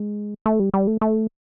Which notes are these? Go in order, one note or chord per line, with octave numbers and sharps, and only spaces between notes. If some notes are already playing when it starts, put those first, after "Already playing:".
Already playing: G#3
A3
G3
G3
A3
A3